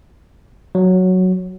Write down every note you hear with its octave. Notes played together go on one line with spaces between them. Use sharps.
F#3